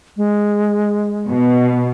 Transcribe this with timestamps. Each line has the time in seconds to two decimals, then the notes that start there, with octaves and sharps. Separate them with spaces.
0.17 G#3
1.27 B2